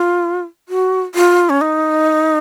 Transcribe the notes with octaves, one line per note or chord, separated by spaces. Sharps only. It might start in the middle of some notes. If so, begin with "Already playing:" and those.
Already playing: F4
F#4
F4
C#4
D#4